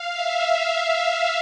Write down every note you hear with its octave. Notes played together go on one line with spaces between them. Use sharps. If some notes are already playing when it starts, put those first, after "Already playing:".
Already playing: F5
E5
F5
F5